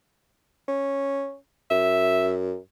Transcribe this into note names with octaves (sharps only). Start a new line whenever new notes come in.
C#4
F#2 E5